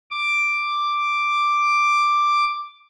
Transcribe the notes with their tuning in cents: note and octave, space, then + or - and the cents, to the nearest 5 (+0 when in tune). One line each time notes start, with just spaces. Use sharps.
D6 +5